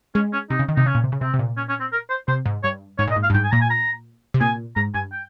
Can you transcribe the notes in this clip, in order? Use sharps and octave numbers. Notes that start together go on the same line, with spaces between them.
G#3 C#4
C#4
C3 D#4
C#3
D#3
C3 D#4
C#3 C#4
A#2
C3
C#3
C3 C4
C3
A#2
C#4
C#4
C4
A#4
C5
C3 C5
G#2
G2 C#5
G#2 C#5
A#2 D#5
G#2
F5
G2
G#2 G5
G#5
A#2 A#5
G#5
A#5
C3
A#2 G#5
G#2 A#5
G2 G#5
G5